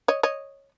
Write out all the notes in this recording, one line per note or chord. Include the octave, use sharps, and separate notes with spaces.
C#5 D#5
C#5 D#5